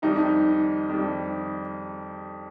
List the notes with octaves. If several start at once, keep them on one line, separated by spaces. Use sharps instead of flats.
F2 D#3 G3 D#4
F2 D#3 G3